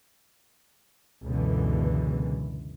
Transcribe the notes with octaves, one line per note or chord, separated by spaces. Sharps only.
C#2 F#2 B2 D3 E3